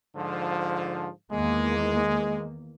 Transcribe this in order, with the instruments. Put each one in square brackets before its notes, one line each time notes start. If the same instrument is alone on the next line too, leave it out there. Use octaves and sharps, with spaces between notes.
[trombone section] G#2 D3 F3
[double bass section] E2 D#3 A#3 [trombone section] G#3